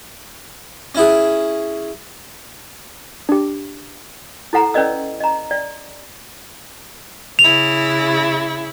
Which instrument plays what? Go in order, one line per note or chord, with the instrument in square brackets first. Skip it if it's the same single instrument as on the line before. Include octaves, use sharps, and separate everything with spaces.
[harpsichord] C#4 E4 G#4
[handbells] D4 G4
[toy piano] E4 A4 F#5 A#5
C#4 B4 D5 D#5 E6
D#5 A#5
D5
[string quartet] C#3 E4 [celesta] F7